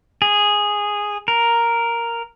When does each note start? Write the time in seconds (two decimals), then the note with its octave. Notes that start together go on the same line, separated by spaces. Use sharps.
0.22 G#4
1.28 A#4